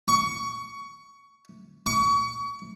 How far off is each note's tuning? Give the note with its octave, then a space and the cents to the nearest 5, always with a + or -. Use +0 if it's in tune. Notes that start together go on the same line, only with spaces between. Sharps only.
C#6 +20
C#6 +35